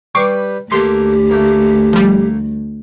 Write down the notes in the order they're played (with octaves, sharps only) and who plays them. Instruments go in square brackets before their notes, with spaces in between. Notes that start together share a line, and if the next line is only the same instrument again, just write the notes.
[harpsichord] G3 B4 [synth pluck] C#6 D6 C7
[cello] D2 [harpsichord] A3 A#3 [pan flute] G4 [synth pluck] C6
[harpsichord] A3 A#3
[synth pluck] F3 G3